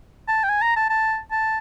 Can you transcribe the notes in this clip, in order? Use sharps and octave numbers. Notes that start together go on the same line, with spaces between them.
A5
G5
G#5
A#5
A5
A5
A5